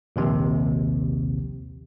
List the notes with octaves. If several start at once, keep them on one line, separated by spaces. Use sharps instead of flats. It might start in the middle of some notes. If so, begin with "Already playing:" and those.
A#1 D#2 C3